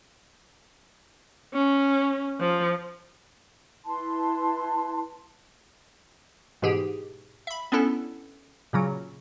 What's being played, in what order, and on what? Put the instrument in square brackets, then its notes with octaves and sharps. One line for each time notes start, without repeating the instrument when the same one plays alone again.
[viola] C#4
F3
[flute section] E4 B4 A5 C6
[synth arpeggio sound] G#2 B2 E3 G4 G#4
E5 B5
B3 C#4 D4 E4 A4
A#2 C#3 F#3